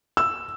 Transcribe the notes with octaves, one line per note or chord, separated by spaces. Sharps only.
E6